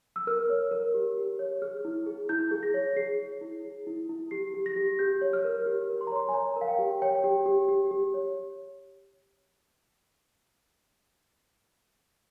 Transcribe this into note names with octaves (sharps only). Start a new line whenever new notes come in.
E6
A#4 F6
C#5
A#4
G4
G4
C#5
G#4 F6
E4
G#4
E4 G6
G#4
A#6
C#5
G#4 C7
C#5
E4
G#4
E4
E4
G4 C7
G4
A#6
G4
G4 G6
C#5
F6
A#4
G4
A#4
C6
A#5
C#5 C6
G#5
C#5 A#5
A#4
F5
G5
G4
C#5 G5
G4
G4
G4
G4
C#5